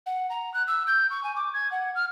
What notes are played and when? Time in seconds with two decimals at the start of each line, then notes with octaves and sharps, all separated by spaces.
0.06 F#5
0.30 A#5
0.54 F#6
0.68 E6
0.87 G6
1.11 C#6
1.24 G#5
1.36 D6
1.54 G#6
1.72 F#5
1.95 F6